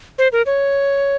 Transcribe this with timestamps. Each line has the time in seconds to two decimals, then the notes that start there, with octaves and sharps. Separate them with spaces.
0.18 C5
0.32 A#4
0.46 C#5